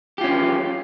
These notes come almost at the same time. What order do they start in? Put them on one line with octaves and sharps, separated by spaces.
G4 F4 C#4